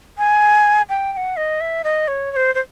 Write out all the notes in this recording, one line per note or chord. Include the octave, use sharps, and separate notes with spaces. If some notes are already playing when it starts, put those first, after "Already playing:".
G#5
G5
G5
F#5
D#5
E5
D#5
C#5
C#5
C5
C5